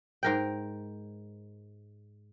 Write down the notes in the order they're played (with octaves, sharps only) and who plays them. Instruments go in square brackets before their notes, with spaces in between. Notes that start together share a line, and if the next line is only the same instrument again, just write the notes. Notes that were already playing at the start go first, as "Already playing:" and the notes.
[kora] G#2 A#4 G5